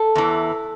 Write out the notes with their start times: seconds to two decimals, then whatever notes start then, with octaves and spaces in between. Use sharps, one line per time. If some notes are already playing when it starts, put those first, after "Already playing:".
Already playing: A4
0.15 E2 E3